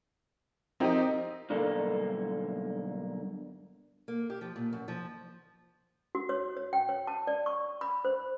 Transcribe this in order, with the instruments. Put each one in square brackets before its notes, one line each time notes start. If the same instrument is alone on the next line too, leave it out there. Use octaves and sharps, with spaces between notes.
[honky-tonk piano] F3 D#4 G4 [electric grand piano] C4 [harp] A#4 D#5
[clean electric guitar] B1 G2 D3 A#3
[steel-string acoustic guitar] A#3
G4
F3
A#2
F#2
F3
[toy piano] F#4
C#5
C#5
G5
C#5
A5
D5
C#6
B5
C5